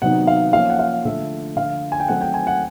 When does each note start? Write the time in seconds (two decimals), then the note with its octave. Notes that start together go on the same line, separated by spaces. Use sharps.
0.02 C3 D#3 F#3 B3 D#4 F#5
0.27 F5
0.53 F3 A#3 C#4 F5
0.70 F#5
0.79 F5
1.05 D3 F3 A3 E5
1.56 D3 F3 A3 F5
1.92 G#5
2.00 G5
2.08 D#3 F#3 A3 C4 D#4 F#5
2.21 G5
2.34 G#5
2.47 F#5